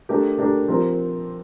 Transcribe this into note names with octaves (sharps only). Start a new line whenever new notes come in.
A3 D4 G4 A#4
A3 D4 G4 A#4
F3 C4 G4 A#4